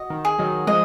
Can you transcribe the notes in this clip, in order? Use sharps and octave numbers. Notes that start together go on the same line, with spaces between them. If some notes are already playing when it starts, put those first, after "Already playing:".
Already playing: F#4 D#5
D#3
G#4
D#3 F#3
F3 G#3 D#5